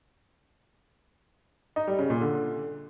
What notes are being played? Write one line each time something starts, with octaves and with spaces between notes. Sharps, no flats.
D#4
G3
C#3
A#2
D3